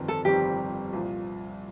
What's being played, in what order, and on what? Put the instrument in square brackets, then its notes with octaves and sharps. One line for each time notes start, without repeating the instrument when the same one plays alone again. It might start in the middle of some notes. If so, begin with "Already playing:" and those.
Already playing: [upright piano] G1 F2 D#3 G3 C4
[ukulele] A4
[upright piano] G1 F2 D#3 G3 C4 [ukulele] G4
[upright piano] C2 A#2 F3